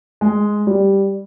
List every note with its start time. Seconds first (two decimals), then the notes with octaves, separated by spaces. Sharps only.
0.21 G#3
0.67 G3